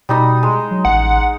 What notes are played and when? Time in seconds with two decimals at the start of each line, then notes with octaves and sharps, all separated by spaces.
0.09 B2 G3 D#4 D#6
0.43 G#3
0.71 F#3
0.85 A1 F#5